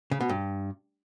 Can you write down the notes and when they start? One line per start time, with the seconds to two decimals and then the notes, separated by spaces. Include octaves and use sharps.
0.11 C#3
0.20 B2
0.29 G2